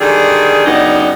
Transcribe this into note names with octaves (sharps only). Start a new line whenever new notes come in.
D3 D#3 G3 G#4
F#2 C#3 G3 B3 D4 D#4